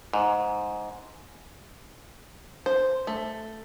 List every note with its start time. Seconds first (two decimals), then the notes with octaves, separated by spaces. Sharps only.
0.13 G#2
2.66 C5
3.07 A3